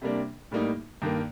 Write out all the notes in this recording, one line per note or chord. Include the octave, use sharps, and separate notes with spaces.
C3 G3 A#3 D4
A2 G3 A#3 D#4
G2 D#3 A#3